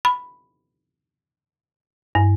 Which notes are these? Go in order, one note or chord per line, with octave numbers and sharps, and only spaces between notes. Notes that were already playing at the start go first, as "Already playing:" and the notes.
B5
G2